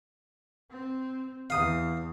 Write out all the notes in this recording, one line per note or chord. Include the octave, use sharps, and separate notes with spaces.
C4
E2 F5 D#6